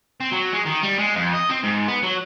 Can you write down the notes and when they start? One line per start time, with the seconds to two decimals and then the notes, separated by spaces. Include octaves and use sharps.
0.20 C4
0.32 F#3
0.54 G#3
0.67 D#3
0.83 G3
0.99 G#3
1.16 F2
1.33 D#5
1.50 C4
1.64 G#2
1.88 B3
2.03 F#3